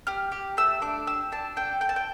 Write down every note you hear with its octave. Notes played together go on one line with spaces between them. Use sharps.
G4 F6
G4
A3 E6
D4 D6
G4 E6
D4 A5
A4 G5
A4 G5
A5
G5